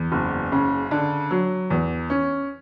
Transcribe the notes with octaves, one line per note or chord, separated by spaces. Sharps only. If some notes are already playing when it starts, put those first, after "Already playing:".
Already playing: E2
F#1
C#3
D3
F#3
E2
C#4